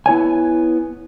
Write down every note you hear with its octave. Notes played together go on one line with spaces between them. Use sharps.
B3 E4 C#5 G#5